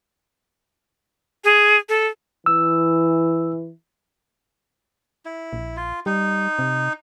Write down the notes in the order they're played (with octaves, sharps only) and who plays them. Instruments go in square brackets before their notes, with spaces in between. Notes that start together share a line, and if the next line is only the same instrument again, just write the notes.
[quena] G#4
A4
[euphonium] E3 [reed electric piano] E6
[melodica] E4
[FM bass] A#1
[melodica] F4
[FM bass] G3 [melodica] D#4
[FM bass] C3